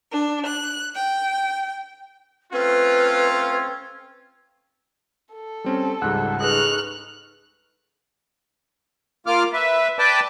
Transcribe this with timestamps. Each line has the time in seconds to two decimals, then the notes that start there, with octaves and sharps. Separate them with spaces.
0.10 D4
0.46 F#6
0.95 G5
2.53 A3 C4 C#4 F4 B4
5.33 A4
5.64 G3 C4 C#4
6.02 C#2 G#2 G3 F#5 E6 F#6
6.41 D#4 G#4 A4 B4 C#6 F6 F#6
9.26 A#3 F4 D6 F6
9.53 B4 E5
9.99 B4 D5 G5 A5 D6